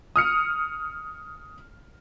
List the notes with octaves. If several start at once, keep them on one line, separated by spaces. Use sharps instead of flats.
D#6 F6 C#7